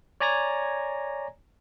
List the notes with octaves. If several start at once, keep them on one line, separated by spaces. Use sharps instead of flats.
C#5 D5 G#5 A#5 G#6 A#6